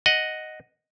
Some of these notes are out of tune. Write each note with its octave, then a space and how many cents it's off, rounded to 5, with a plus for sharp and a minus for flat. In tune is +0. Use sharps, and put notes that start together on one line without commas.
D#5 +0 F#5 +0